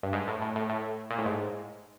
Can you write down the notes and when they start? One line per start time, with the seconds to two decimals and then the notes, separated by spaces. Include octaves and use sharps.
0.03 G2
0.13 G#2
0.28 A2
0.42 A2
0.56 A2
0.69 A2
1.10 A#2
1.18 A2
1.25 G#2